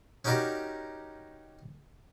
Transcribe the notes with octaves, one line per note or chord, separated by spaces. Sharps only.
C#4 D#4 F#4 G4 A#4 D5